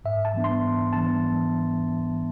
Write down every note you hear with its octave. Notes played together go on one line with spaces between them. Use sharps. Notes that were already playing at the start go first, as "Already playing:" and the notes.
G#2 E5
A5
E3 G3 B3 D4
C6
G#2
E3 G3 B3 D4 A5